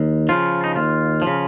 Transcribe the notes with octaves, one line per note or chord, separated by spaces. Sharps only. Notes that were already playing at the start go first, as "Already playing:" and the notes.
Already playing: D#2
C#3 F3 F4
D#4
D#2 F4
F3
C#3